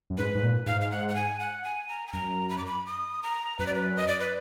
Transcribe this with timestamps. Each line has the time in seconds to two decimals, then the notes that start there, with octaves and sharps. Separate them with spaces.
0.10 F#2
0.18 G#2 B4
0.35 G#2
0.42 A#2
0.66 G#2 F5
0.81 F5
0.91 F#5
1.08 F#5
1.15 G#5
1.40 F#5
1.64 G#5
1.89 A#5
2.07 G#5
2.12 F#2 A#5
2.49 B5
2.58 D6
2.66 B5
2.87 D#6
3.23 A#5
3.59 F#2 B4
3.67 D5
3.74 B4
3.97 D#5
4.08 D5
4.20 B4